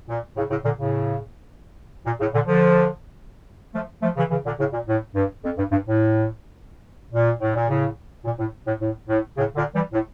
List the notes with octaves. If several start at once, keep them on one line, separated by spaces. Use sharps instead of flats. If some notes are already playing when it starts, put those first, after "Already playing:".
A#2
A2 C#3
A2 C#3
A#2 D3
A2 C#3
A#2
A2 C#3
A#2 D3
D3 F3
F3 A3
F3 A3
C#3 E3
C#3 E3
A#2 D3
A2 C#3
A#2
A2
G2
F2
G2
G2
A2
A#2
A2
A#2
A2 C#3
A#2
A2
A2
A2
A2
A2 C#3
A#2 D3
E3 G3
A2